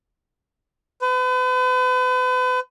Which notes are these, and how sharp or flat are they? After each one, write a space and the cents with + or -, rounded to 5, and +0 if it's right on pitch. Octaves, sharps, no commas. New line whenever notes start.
B4 +40